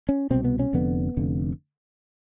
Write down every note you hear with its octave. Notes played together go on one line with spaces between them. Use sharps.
C#4
C2 B2 C4
B3
C#4
F1 F2 D3 B3
F1 F2 D3